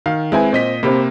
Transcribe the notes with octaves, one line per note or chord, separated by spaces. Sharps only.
D#3 F5
G#3 C4 E4 B4 G#5
A#2 C4 D#5 B6
C3 A#3 C4 G4 B5